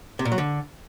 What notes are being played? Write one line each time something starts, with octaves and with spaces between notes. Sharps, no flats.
C3
A#2
F#3
D3